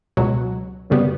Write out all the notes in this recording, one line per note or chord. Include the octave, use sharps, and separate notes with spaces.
C#2 B2 F#3
F#2 C#3 G3 B3